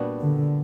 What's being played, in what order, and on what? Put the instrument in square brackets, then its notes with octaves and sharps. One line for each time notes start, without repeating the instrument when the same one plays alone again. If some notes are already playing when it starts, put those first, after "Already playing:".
Already playing: [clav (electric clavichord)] A#2 G3 B3 D4 F#4
[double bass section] D3